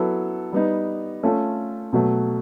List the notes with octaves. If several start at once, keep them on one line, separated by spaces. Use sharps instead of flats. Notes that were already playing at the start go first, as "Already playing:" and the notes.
Already playing: F#3 B3 E4 A4
G3 B3 D#4
A3 C#4 F4 A4
B2 F#3 A3